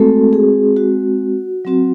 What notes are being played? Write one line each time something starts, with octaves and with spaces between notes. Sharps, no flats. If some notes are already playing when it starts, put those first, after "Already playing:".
Already playing: G#3 A3 C4 F#4 A4
G#4
F#4
F#3 C4 F#4